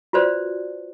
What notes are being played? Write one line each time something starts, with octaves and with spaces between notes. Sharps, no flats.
F4 F#4 B4 C5 D5